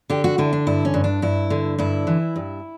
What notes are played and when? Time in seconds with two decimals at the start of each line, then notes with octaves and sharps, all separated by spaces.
0.10 D3 G4
0.24 F#4
0.38 D3 E4
0.53 D4
0.67 G2 E4
0.85 C#4
0.94 G2
1.04 D4
1.22 G2 E4
1.50 D3
1.78 G2 E4
2.07 E3
2.36 G2